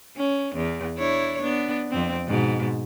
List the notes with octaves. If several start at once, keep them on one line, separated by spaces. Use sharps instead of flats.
C#4
E2
D4 E4 C#5
B3 D4
F2 C4
G#2 B2